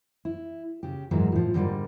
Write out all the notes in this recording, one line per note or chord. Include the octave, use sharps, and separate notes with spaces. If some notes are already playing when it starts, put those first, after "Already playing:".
E4
C#3 G4
G#2 E3 F#3 G#3 A#3 F#4
A2 F3
G#2 D3 F#3 G3 A#3